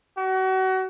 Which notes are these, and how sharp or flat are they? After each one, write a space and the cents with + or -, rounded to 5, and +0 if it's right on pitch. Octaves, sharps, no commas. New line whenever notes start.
F#4 +30